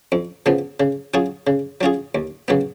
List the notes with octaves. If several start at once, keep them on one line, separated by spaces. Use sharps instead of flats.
F2
C#3 F3 B3
C#3
F#3 C#4 F4 G#4
C#3
F#3 C#4 F4 G#4
D#2
C#3 F#3 B3